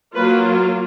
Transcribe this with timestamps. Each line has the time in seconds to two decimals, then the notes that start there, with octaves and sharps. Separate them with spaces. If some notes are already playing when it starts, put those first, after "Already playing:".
0.16 F#3 A#3 F4 B4